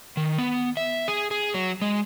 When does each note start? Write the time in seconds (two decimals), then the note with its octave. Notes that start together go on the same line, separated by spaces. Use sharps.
0.17 D#3
0.38 B3
0.77 E5
1.08 G#4
1.31 G#4
1.54 F#3
1.82 G#3